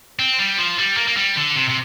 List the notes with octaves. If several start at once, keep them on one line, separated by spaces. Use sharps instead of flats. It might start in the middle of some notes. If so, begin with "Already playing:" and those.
C4
G3
F3
G3
A#3
A#3
G3
D3
C3
C3